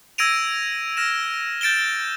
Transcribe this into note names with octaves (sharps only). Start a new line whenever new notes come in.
E6 G#6 A#6 D7 D#7 F7
F6 A#6 E7
G6 A6 D7 E7 G7